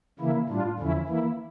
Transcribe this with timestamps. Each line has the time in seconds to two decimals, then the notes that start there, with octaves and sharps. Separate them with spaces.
0.19 C#3 E3 A#3 E4
0.48 A2 G3 D4 F4
0.79 E2 D3 F3 C#4 E4
1.08 E3 A#3 E4